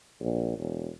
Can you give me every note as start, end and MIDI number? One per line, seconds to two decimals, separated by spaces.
0.22 0.55 34
0.58 0.90 28